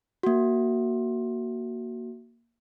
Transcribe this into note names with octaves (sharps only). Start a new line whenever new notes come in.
A#3 F#4